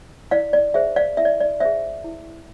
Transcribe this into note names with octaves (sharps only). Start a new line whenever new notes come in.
E4 D5 F5
D5
G#4 C5 E5
D5 F5
E4 E5
D5
D5
G#4 C5 E5
E4